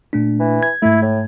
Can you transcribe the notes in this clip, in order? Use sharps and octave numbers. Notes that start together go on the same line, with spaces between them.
A#2 A3 D4
E3
G#6
G#2 A3 E4
A2